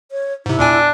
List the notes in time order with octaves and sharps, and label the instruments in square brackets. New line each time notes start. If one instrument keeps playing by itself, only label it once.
[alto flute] C#5
[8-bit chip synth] G#2 C3 [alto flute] E4
[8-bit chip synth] E2 A#2 G#5 [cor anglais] D4